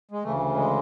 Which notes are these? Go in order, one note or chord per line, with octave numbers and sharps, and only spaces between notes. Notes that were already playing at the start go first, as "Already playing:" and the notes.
G#3
D2 C#3 E3 A3
G#3